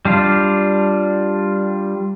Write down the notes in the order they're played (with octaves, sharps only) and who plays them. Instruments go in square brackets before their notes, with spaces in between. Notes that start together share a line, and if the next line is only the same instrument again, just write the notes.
[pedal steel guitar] G3 D4 F4